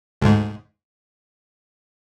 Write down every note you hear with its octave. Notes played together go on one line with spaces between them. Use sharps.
D2 G#2